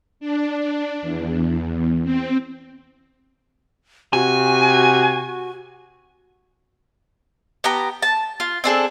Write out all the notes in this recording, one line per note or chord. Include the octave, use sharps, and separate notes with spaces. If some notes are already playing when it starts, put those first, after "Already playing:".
D4
E2
C4
C3 F#4 G#5
B3 G4 A#5
A5
F4
C4 D4 G#4 A4